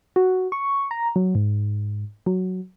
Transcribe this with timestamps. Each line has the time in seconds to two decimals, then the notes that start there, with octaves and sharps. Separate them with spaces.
0.16 F#4
0.52 C#6
0.91 A#5
1.16 F#3
1.35 G#2
2.26 F#3